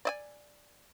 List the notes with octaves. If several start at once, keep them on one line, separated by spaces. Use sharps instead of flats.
D5 D#5 G#5